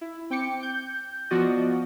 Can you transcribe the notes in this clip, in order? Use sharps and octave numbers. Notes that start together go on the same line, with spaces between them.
E4
C4 G5 D6 C#7
G6
F3 B3 F4 F#4 D5 D#5